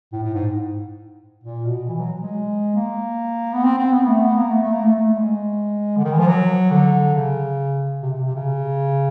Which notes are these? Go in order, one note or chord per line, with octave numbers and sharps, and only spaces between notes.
A2
A2
G#2
A#2
B2
E3
F#3
G#3
A#3
B3
C4
C4
B3
A3
B3
A#3
A3
A3
A#3
A3
A3
G#3
D3
D#3
E3
F3
F#3
D3
C#3
C3
C3
C3
C#3